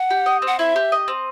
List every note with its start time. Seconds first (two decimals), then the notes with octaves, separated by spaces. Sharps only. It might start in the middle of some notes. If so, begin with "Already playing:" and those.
Already playing: F#5
0.10 G4
0.26 D#5
0.42 C4
0.47 F#5
0.59 E4 E5
0.76 G4
0.92 D#5
1.08 C4